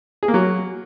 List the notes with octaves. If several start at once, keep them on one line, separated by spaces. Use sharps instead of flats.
G#4
A#3
F#3